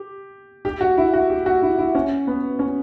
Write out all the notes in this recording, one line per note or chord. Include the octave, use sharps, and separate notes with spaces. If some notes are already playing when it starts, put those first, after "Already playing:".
Already playing: G4
G4
F#4
E4
F#4
G4
F#4
E4
E4
C#4
B3
C#4